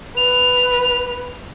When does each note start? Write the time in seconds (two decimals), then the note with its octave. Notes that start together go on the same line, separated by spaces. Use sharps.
0.17 B4 F7